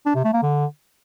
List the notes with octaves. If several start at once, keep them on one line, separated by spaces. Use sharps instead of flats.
D4
C3
A3
A#3
D3